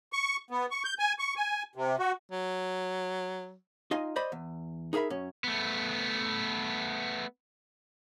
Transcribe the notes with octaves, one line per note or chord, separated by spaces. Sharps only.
C#6
B3
C#6
G6
G#5
C#6
G#5
C3
F#4
F#3
D#4 F4 D#5 G#5
C5 D5 D#5 B5
E2
D#4 G#4 A#4 E5 B5
F#2 C#4
A3 B3